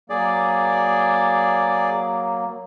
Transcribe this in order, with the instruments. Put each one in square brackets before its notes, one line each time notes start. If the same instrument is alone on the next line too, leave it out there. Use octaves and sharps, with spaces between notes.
[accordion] F#3 A#3 [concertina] G#4 D5